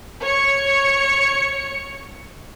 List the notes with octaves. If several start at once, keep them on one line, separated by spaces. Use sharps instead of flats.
C#5 C#7